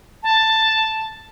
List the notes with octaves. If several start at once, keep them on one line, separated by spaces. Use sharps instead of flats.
A5